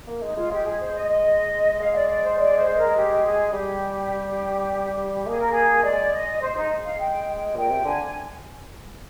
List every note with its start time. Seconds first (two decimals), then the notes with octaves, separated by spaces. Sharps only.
0.07 A#3
0.22 G#3 D#4
0.36 G#3 F4
0.51 G#3 G4
0.65 G#3 G#4
0.80 C5
0.95 D#5
1.09 D#5
1.80 G#3 F5
1.95 D5
2.09 D5
2.24 C5
2.38 D5
2.57 C5
2.77 A#4
2.95 G4
3.25 G#4
3.53 G3 G4
5.26 A#3 G#4
5.39 A#4
5.52 G#4
5.83 G#3 D5
6.13 D#5
6.41 C5
6.56 D#4
6.84 F5
6.99 G5
7.28 G5
7.56 A#2 G5
7.71 C3
7.85 D3 G#5